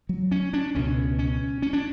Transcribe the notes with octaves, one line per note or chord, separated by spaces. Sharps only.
F#3
C#4
D4
C#2 B2 C#4
C#4
C#4
D4